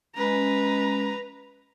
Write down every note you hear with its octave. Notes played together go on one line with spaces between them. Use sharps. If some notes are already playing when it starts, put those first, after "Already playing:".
G#3 C#4 B4 A#5